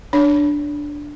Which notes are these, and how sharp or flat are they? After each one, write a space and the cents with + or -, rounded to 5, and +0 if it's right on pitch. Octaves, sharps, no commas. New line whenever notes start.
D4 +0 C#5 +25